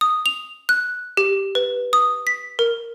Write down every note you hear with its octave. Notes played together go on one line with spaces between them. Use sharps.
D#6
F7
F#6
G4
B4
D#6
B6
A#4